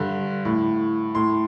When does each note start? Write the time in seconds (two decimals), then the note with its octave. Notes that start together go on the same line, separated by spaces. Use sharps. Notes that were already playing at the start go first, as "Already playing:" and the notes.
Already playing: G2 D3
0.45 A2
1.15 A2 C6